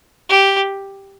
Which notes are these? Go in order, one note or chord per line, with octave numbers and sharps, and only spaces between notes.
G4